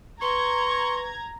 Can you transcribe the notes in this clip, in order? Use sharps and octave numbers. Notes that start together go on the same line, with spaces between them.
B4 A#5 C6 C#6 G#6